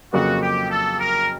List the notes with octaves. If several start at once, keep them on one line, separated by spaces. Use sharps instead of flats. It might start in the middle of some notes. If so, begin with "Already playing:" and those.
F2 C#3 F#3 A#3 F#4
G4
A4
A#4